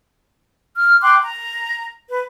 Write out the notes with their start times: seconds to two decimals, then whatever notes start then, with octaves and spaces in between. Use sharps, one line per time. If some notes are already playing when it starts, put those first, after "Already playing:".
0.76 F6
1.02 G5 C6 D6 F#6
1.21 A#5
2.08 B4